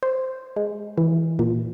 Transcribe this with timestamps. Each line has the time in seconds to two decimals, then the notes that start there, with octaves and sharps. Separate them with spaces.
0.03 C5
0.56 G#3
0.98 E3
1.39 A#2